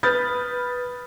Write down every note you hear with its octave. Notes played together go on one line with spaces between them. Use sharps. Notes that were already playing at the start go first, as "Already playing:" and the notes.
B4 B5 D#6 F6 G6 A6